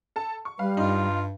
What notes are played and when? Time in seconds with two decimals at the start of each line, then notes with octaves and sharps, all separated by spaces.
0.16 A4 A5
0.45 C#6
0.59 G3 B4 F5
0.77 G2 D#4 F4